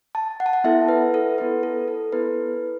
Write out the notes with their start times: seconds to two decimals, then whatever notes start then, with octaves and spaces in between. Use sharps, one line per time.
0.15 A5
0.40 F#5
0.46 A5
0.53 F#5
0.64 B3 E4 A4 E5
0.88 B4
1.14 A4
1.38 B3 E4 A4 B4
1.63 A4
1.88 A4
2.12 B3 E4 A4 B4